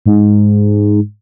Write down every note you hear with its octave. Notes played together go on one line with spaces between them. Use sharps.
G#2